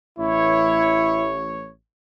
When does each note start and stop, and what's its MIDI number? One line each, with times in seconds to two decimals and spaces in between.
0.18 1.71 33
0.18 1.40 64
0.18 1.71 73